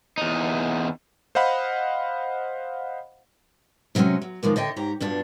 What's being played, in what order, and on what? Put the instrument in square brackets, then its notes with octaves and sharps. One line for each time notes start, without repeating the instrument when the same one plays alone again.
[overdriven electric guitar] E2 D#4
[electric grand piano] C5 D#5 F5 F#5 B5
[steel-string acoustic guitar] C3 F#3 G#3 C4 C#4
F#3
D#3 F3 G#3 A#3
D3 C#5 D#5 G5
G#2 G4 C#5 A#5
G2 B2 D4 F4